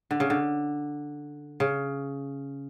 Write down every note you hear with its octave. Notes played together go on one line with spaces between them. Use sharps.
D3
C#3
D3
C#3